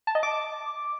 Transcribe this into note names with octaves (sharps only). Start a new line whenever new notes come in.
A5
D#5
D6